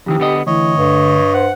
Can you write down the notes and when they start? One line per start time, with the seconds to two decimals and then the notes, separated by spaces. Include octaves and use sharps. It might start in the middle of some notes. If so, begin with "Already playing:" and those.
0.06 F2 D#3 E3 G4
0.20 D3 B3 D#5
0.47 D2 E3 C#5 D#5
0.77 G2 D3
1.34 C5 F#5